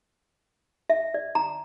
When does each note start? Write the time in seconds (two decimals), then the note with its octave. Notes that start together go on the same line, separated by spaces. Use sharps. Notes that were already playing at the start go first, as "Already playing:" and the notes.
0.90 E5
1.14 D5
1.35 A#5